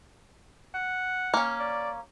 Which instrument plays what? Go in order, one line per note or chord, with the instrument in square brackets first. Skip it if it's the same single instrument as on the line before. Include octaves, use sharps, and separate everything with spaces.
[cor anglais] F#5
[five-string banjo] A#3 C#4
[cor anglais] D5